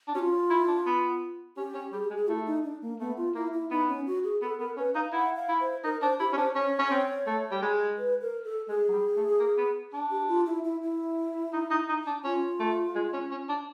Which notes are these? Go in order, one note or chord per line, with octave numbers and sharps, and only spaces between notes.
D4
C#4 F#4
F4
E4
D4
B3
C#4 G4
C#4
G3 G#4
G4
G#3
G#4
A3 E4
D#4
D4
A#3
A3 B3
F4
A#3 E4
E4
B3 D#4
C#4
F#4
G#4
B3 A4
B3 A#4
C#4 B4
D#4 F5
E4 F#5
F5
E4
C5
D#4 A#4
D4 C5
E4 G4
C#4
D4 C5
C#4 C#5
C#4
C4
A3
G3
G#3
B4
A#4
A4
G#3 G#4
F#3
G3
A3
A#3
B3
D4
G4
F4
E4
E4
E4
D#4
D#4
D#4
D4
C#4 F4
A3
G#3
C#4
C#4
D4